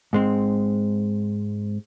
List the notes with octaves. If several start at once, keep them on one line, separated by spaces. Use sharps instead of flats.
G#2 G#3 C4